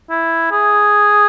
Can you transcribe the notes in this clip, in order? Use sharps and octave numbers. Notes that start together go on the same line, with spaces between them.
E4
G#4